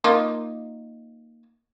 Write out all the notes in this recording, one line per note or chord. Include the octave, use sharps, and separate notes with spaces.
A#3 D#4 F4